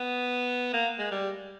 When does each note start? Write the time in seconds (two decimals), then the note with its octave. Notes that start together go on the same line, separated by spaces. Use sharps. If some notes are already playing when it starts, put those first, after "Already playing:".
Already playing: B3
0.73 A#3
0.99 G#3
1.11 G3